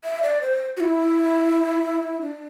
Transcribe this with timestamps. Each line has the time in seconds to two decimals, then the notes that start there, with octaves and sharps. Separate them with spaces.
0.05 E5
0.23 D5
0.41 C5
0.77 F#4
0.80 E4
2.22 D4